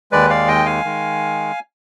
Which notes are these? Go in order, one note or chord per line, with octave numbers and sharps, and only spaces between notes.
D#2 D#3 G#3 B4 D5
D5 F5
D#5 G5
F5 G#5
D#3 G#3